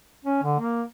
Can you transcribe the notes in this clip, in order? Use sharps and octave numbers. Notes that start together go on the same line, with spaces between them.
C#4
D3
A#3